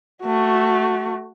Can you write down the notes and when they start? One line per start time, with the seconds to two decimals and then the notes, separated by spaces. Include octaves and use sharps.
0.22 A3 F#4